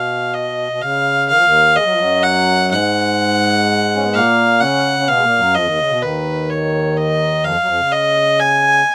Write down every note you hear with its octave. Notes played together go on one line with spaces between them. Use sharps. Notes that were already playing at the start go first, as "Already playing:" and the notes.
Already playing: B2 F5
D#5
B2
C#3 F5
D#3 F5
F3
D#2 D#3
G#3 D#5
F#3
F3
F#2 F#3
F#5
G#2 G#3 F#5
C#4
B3
A#2 A#3 F5
C#3 C#4 F#5
C#4
B2 B3 F5
G#3
A#2 A#3
F#2 F#3
F2 F3 D#5
D#2 D#3
C#3
B2
D#2 D#3 B4
C#5
D#5
F2 F3 F5
F#3
F2 F3
C#3
D#5
G#5